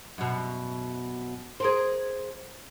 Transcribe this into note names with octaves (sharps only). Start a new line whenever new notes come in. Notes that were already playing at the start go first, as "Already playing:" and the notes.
F#2 B2
G#4 A#4 C5